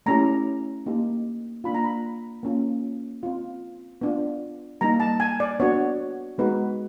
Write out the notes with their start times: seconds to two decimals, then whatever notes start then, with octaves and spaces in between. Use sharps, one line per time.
0.06 A3 C#4 E4 G4 A#5
0.86 A#3 D#4 G4
1.64 A#3 D4 F4 B5
1.75 A#5
1.84 B5
2.43 A#3 C#4 F4
3.23 C4 F4
4.01 B3 D4 F4
4.81 G3 A#3 D#4 A#5
5.00 A5
5.20 G#5
5.40 D5
5.60 B3 D4 F#4 C#5
6.38 G#3 B3 D#4 F#4 B4